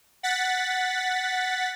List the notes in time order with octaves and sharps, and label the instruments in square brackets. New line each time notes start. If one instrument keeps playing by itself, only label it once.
[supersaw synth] F#5 A6 B6